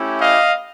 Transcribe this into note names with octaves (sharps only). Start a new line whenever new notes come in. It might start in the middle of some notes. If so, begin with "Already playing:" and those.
Already playing: A3 C#4 E4 G4
D#5 F5